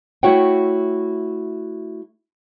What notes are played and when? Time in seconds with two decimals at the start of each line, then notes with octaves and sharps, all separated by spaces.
0.23 A3 E4 F#4 C#5 F#5 G5